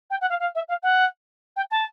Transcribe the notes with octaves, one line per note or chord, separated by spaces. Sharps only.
G5
F#5
F5
F5
E5
F5
F#5
G5
A5